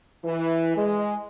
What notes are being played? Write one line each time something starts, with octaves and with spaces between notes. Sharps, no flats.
E3
G#3